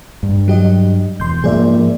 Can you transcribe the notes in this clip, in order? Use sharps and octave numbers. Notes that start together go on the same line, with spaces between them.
G2
F#3 G4 D#5
E1 C6 G6
G#2 F3 A#3 G#4 D5 E5